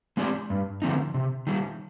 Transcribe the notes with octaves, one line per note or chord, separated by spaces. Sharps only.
G#3 C4 G4 D5
G2
D3 F3 C4 D#4
C3
D#3 G3